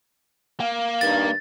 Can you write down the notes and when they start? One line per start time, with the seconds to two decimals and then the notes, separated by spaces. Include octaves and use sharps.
0.60 A#3 F5
1.01 G2 D#3 A6